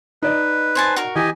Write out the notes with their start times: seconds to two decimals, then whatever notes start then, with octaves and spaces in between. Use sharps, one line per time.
0.22 D#4 B4 D5 D#5
0.75 C5 G#5 A5
0.96 F#4 A#4
1.15 E3 G4 D#5 G#5